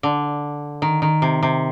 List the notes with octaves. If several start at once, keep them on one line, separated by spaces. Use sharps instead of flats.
D3
D#3
D#3
C3
C3